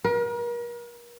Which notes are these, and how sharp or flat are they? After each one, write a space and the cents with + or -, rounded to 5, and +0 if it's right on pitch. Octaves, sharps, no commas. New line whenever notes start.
A#4 +40